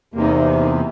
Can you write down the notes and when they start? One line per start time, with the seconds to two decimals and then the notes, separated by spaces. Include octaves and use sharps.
0.14 E2 C3 A#3 D#4